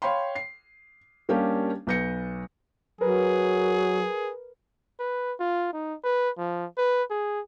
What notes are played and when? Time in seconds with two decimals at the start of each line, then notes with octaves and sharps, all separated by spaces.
0.02 C#5 F5 G5 B5 C6
0.35 C7
1.29 G3 A#3 C#4 D4 G4 F5
1.87 B1 B4 G6 A#6 C#7
3.01 F#3 G#4 A#4 B4
4.99 B4
5.40 F4
5.73 D#4
6.04 B4
6.38 F3
6.78 B4
7.10 G#4